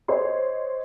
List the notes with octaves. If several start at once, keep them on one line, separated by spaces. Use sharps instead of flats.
C5 C#5 D#5 C6